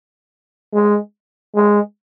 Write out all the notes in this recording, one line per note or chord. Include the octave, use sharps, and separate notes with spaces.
G#3
G#3